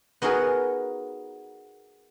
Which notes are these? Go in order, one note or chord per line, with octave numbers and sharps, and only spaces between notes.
B3 D#4 F#4 G#4 A#4